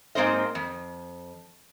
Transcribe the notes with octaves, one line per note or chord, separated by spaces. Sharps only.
G#2 A#3 C4 C5 D#5
F2